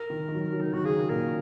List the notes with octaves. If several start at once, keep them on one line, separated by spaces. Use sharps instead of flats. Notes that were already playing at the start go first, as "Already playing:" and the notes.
Already playing: A#4
D#3
D#3
F#3
F#3
D#3 D#4
D#3 F#4
C#3 G#4
A#2 A#4